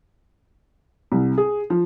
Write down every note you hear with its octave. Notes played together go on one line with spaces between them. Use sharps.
C2
G#4
F3